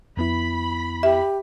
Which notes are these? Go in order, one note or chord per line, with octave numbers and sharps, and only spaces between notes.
F2 B3 E4 B5
G4 E5